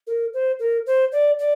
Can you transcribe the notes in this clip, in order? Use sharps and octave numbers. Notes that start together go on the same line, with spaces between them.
A#4
C5
A#4
C5
D5
D5